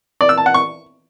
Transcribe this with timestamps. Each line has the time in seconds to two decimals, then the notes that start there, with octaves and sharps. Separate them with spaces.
0.21 D5
0.29 E6
0.38 A5
0.46 F#5
0.54 C#6